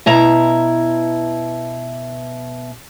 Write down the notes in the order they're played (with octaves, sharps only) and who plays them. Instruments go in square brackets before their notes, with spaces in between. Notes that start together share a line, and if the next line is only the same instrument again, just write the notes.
[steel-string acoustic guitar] B2 E4 A#5